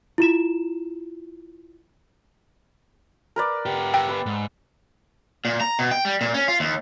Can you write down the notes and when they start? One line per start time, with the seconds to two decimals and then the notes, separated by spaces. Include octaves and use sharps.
0.18 E4 F4 E7
3.36 A#4 B4 D5
3.66 B3 G4
3.94 G5 E6
4.09 B4
4.26 G#2
5.45 A#2
5.61 A#5
5.79 B2
5.91 G5
6.05 G3
6.21 A#2
6.34 C#4
6.48 F4
6.60 D#2